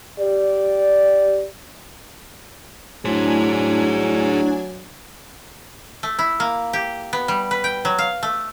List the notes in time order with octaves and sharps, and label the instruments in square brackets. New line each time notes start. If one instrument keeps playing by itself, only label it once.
[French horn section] G4 D5
[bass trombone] F#3 [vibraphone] A3 E4 [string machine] D4 G#5 [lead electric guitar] G#4 C5
[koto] A3
E4
A#3
G4
B3
G3
B4
G5
F#3
F5
A3